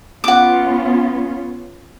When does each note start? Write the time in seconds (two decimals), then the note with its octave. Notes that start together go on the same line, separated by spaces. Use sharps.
0.24 B3 C#4 F4 F#5 D6